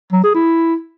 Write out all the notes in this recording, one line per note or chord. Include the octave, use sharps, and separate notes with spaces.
F#3
G#4
E4